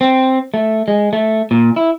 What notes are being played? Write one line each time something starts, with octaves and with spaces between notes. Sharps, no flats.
C4
A3
G#3
A3
A#2
E4